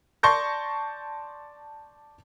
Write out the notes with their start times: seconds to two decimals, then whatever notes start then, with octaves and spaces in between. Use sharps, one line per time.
0.23 D5 A5 C6 C#6 G6 A#6